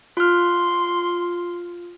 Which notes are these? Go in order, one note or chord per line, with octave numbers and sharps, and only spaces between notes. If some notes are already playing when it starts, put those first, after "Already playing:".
F4 C6 F6